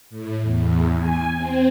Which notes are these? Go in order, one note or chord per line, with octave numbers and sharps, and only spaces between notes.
A2
E2
G#5
C4